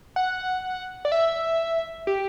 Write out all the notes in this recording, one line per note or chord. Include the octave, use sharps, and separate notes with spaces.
F#5
D5
E5
G4